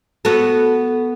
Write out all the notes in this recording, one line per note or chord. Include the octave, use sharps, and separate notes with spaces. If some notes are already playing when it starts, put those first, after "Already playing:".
B3 F#4 A4